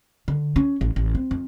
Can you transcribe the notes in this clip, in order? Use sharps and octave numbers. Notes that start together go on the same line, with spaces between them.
D3
C#4
A1
A1
C4
F2